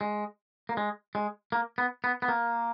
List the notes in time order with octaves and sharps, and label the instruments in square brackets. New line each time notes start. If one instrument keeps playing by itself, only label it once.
[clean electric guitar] G#3
A#3
G#3
G#3
A#3
B3
B3
B3
A#3